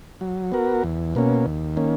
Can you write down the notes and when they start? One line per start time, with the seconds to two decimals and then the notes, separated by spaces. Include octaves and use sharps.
0.21 F#3
0.52 B3 F#4 A#4
0.84 E2
1.15 B2 A#3 C#4
1.46 D#2
1.77 D#3 A#3 C#4